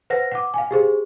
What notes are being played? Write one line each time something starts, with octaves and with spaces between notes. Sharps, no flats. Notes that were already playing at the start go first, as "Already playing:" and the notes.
B4 C5 F#5 A#6
F#5 D6
F5 G#5
G4 G#4 C5